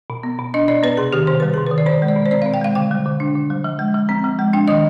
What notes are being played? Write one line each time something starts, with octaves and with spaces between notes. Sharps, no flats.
B2
B3
B2
D4 D#5
B2 D5
B3 B4
C3 G#4
D#3 G4
C3 C5
G3 B4
C3 G#4
B4
D#3
D5
B2 C5
G#3
D5
B2
C5
C4 D5
B2 F5
G5
G#3 F5
D3 G5
G3
D3
D4
D3
G3
F3
G#3
F3
C4
F3
G#3
D4 G5
D#3 D#5